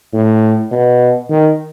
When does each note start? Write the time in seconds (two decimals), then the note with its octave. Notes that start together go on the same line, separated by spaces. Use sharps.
0.13 A2
0.71 B2
1.29 D#3